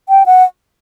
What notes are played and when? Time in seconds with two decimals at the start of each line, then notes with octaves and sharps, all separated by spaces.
0.09 G5
0.26 F#5